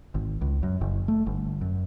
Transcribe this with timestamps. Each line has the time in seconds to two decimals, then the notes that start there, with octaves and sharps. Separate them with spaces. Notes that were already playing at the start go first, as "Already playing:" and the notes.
0.15 G#1
0.41 C#2
0.63 F#2
0.81 F#1
1.08 A3
1.27 G1
1.61 F#2